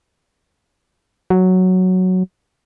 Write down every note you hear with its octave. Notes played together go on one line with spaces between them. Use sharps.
F#3